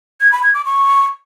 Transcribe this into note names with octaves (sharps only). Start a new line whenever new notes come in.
G#6
B5
G#6
D6
C#6